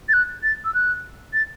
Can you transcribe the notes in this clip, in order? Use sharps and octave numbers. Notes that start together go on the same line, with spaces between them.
A6
F#6
A6
E6
F#6
A6